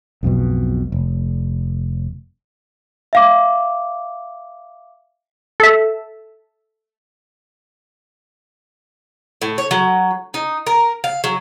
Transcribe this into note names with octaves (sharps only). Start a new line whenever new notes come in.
B1 F2 G#2 B2
F1
E5 F5 D6
A4 E5
A2
C#5
F#3
D#4
A#4
F5
F#3